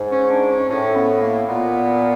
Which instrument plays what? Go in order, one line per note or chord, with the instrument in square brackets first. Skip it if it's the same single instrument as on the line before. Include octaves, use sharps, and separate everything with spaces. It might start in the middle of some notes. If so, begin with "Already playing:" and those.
Already playing: [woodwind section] G#2
[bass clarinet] C#4
D4
C#4
[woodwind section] A2 [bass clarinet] C#4
[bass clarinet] B3
A#3
[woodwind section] A#2 [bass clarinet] B3